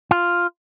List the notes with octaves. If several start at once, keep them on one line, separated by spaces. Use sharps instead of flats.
F4